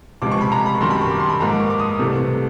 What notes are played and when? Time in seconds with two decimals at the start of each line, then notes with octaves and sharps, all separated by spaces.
0.22 C#2 C3 F3 G#3 D6
0.31 C#6
0.41 B5
0.52 A#5
0.66 B5
0.75 C#6
0.81 F#2 D#3 G3 C6
0.90 B5
1.01 C#6
1.11 D6
1.20 C6
1.29 B5
1.40 G#2 F3 A#3 A#5
1.49 D6
1.60 C#6
1.70 D6
1.79 D#6
1.99 C2 C3 E3 A3